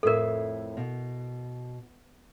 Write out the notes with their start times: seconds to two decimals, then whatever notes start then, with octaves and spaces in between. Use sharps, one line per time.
0.03 F2 A2 A4 A#4 E5
0.77 B2